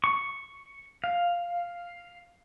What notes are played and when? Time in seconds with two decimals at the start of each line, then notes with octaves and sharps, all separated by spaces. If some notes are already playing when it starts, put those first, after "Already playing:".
0.04 C#6
1.04 F5